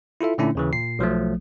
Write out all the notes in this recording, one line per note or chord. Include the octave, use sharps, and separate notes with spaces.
E4 F4 A4 E5
A#2 D3 A3 C#4 D4 E4
D#2 C#3 E3
A#2 C7
B1 F3 F#3 A3